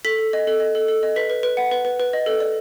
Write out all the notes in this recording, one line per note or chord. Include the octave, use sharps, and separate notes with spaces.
A4 B6
A4
D#5
A4
D#5
A4
A4
D#5
B4 B6
B4
B4
F#5
B4
B4
B4
D#5
A4
D5